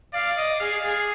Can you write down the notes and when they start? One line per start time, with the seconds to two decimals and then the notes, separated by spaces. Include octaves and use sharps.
0.13 D5 F5
0.36 D#5
0.60 G#4 F5
0.83 G#4